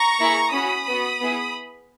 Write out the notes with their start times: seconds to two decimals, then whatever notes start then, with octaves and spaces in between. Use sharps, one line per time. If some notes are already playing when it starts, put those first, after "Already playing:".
Already playing: A#5 C#6
0.19 A#3 E4 G#4
0.53 C#4 F#4 B5 D#6
0.87 B3 F#4
1.20 B3 E4 G#4